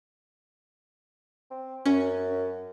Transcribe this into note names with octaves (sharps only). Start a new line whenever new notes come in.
C4
F#2 C#4